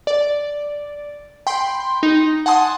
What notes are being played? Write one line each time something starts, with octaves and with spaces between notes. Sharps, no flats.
D5
G5 B5 C6
D#4
F#5 G#5 A5 C6 D#6